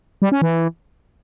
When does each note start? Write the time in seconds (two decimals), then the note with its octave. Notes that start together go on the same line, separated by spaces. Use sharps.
0.22 G3
0.32 C#4
0.42 E3